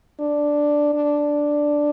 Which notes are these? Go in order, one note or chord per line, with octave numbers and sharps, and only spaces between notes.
D4
D4